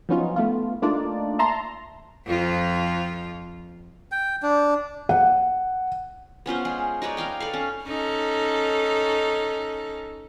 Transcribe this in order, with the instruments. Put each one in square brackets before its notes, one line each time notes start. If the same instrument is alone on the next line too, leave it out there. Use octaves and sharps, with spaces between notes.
[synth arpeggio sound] F3 F#3 B3 C#4 D#4 F4
A3 B3 F4
A3 A#3 D4 D#4 F4 D5
E5 A5 A#5 C6
[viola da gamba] F2 F3 F4
[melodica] G5
D4
[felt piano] F#5
[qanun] B3 C#4 F4 C5
G#3 G#4
D#4 B4 C#5 D5
A#4 B4 F5 G5
A4 B4 F5
C#4
[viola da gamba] C#4 D#4 A4